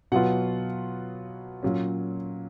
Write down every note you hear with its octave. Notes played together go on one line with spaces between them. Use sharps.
B2 F#3 B3 F4 F#5
A#2 F#3 C#4